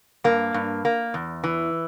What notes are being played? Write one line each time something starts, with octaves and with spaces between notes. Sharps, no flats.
G2 A#3
G2
A#3
E2
E3